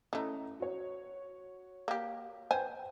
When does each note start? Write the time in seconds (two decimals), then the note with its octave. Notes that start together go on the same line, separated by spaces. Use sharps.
0.13 E3 A3 C#4 D#5 A#5
0.60 F#4 C#5
1.88 A#3 G4
2.51 B4 C5 G5 G#5